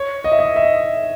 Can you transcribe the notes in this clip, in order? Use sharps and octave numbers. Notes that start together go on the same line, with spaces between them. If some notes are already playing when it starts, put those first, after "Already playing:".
Already playing: C#5
D#5
E5
D#5
E5